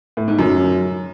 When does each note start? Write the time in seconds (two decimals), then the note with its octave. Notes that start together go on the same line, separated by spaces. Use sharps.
0.17 A2
0.28 G#2
0.39 F#2